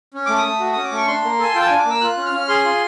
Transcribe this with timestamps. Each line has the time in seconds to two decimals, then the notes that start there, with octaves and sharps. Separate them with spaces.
0.14 C#4
0.26 A3 D6
0.38 D#6
0.45 A3
0.60 F#4
0.73 C#4 D#6
0.84 D6
0.92 A3 C#6
1.07 D4 C6
1.23 A#3
1.40 A4 G#5
1.55 F4 G5
1.61 A5
1.67 D4 G#5
1.79 D6
1.85 A#3 E6
2.01 F4 F#6
2.17 C#4
2.26 F6
2.32 C#4
2.48 G#4 C6
2.64 F4